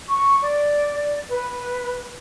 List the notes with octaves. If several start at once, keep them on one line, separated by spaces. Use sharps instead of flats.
C#6
D5
B4